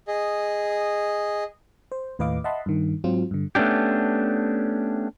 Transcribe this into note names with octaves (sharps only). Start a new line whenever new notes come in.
G#4 D#5
C5
D#2 A2 B4 D#5 F5 D6
D#5 E5 F#5 A5 B5 C6
G2 D#3
G#2 F#3 C4 F4
G2 D3
A3 B3 C#4 D4 G4